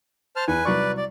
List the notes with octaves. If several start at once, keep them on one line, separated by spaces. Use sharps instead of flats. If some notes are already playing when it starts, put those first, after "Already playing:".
C5 A5 F6
E2 B4 G#5
C2 F#3 B4 D5 C#6
D5